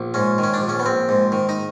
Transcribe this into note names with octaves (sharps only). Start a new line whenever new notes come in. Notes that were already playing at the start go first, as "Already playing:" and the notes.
Already playing: A#1
G#2 C#4
D#3
C#4
D4
A#1
C#4
B3
A#1 C4
G#2
D#3
D#4